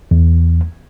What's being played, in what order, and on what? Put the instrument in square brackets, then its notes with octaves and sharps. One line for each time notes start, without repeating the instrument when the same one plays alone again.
[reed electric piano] E2